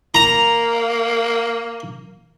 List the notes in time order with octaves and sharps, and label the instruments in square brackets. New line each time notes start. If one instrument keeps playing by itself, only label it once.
[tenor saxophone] A#3 [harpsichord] A#5